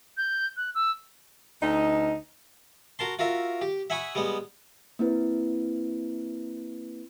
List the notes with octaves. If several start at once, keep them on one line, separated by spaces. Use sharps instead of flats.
G6
F#6
E6
D2 D#4
F#4 A#4 A5 C6
F4 F#4 A#4 E5
G4
E5 F#5 G#5 B5 C#6 D#6
G3 G#3 B3 F#5
A#3 C4 E4 B4